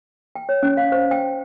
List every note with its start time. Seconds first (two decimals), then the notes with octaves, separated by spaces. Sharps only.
0.36 G5
0.49 C#5
0.63 C#4
0.77 F5
0.92 C5
1.11 G5